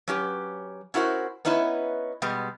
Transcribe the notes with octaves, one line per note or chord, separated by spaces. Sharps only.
F#3 C#4 G4 B4
C#4 E4 F#4 A#4 C5
B3 C#4 D#4 E4 B4
B2 G3 G#3 B3